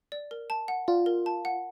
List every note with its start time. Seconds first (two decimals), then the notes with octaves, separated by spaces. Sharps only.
0.12 D5
0.31 A#4
0.50 A5
0.68 F#5
0.88 F4 D5
1.06 A#4
1.26 A5
1.45 F#5